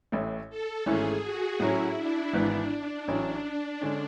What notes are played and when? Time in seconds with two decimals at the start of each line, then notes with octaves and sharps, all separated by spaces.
0.12 A1 A2 E3 A3
0.50 A4
0.86 G#1 G#2 E3 A3 C#4 G#4
1.23 F#4
1.60 A2 F#3 C#4 E4
1.97 D4
2.33 G#1 G#2 E3 B3
3.08 A1 A2 F#3 C#4 D4
3.81 D3 G#3 C#4